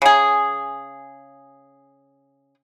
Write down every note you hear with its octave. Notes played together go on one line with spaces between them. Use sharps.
C#3 G#4